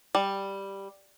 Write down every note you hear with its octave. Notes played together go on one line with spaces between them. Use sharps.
G3